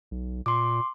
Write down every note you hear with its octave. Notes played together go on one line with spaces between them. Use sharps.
B1
A#2 C6 D6